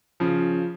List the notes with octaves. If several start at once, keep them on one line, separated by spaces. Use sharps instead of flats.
C#3 F3